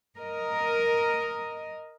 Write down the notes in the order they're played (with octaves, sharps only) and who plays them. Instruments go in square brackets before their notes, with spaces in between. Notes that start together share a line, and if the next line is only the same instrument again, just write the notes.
[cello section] A#4 D#5